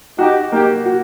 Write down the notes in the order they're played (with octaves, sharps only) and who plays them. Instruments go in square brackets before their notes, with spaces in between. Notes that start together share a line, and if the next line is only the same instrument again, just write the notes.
[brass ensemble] D#4 G4 [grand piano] F#4
[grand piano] A#3 [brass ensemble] D#4 G4
[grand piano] F#4